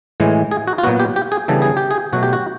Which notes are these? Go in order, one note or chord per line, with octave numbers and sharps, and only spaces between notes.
A2 E3 G#3
G#4
F#4
F4
A#2 F#3 B3 F#4
G4
G4
G#4
C#3 E3 G3 B3 D4 A4
G#4
G4
G#4
B2 F#3 A3 F#4
G4
F#4